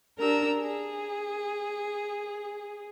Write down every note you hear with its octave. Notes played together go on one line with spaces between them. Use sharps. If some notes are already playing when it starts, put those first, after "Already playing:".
D4 G4 A#4 A#5 E6
G#4